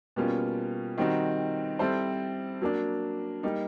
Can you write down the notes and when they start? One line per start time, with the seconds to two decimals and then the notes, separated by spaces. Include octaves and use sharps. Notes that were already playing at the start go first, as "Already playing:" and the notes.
0.16 B2 G3 A#3 C#4 F4
0.98 D#3 G3 C4 D#4 F#4
1.79 G3 C4 E4 A4 C5
2.62 F#3 A#3 D4
3.43 G3 A#3 D#4